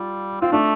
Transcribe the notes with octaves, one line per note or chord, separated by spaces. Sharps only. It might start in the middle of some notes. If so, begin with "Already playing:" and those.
Already playing: G3 F4
C4 F4
A3 D4